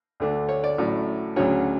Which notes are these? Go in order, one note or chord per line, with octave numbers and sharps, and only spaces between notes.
D2 D3 A3 D4
C#5
D5
A1 A2 F#3
D2 C#3 F#3 C#4 C#5